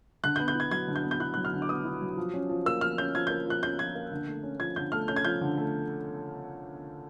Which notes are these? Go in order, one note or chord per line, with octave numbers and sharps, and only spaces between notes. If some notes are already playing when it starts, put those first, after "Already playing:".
D3 F#6
G6
B3
G6
E4 G#6
F#3 G#6
D3
G6
B3
G6
E4 F#6
F#3 F#6
F6
D3
D6
B3 D#6
E4
F#3
F3
C#4
F3
A#3 E6
F3 F6
C#4 G6
F3 G#6
A#3 G6
F3 F#6
C#4 G6
F3 G#6
A#3
D3
A3
C#4
F3 G#6
D3 G6
A3 F6
C#4 G6
G#6
F3 G6
D3
A3